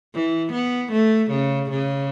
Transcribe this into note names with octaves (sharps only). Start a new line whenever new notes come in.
E3
B3
A3
C#3
C#3